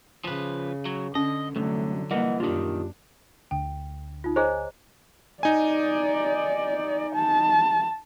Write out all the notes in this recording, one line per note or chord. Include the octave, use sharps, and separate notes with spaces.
C#3 F3 B4
F#3
D3 C#4 D#5
C2 F#2 D3 F#3 A3
E3 G3 A#3 A#4 D#5 F#5
F#2 A#2 D#3 D4 F4 G4
D2 G5
D#4 F4
G#4 C5 C#5 D#5 G#5 A#5
D#4 D5 G#5
A5